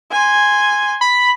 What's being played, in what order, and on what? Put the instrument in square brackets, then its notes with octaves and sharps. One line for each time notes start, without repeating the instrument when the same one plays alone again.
[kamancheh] G#5 C6
[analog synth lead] B5